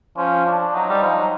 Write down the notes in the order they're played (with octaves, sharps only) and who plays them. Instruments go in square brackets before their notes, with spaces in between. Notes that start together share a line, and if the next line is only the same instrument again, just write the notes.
[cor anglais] F3 [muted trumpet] C#4
[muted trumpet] D4
[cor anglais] F#3 [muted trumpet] D#4
[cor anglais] G3
F3
F#3